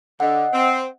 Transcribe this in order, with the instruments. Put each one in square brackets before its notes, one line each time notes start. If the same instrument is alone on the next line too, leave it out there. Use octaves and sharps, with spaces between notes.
[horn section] D3 [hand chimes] D#5 F#5
[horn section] C4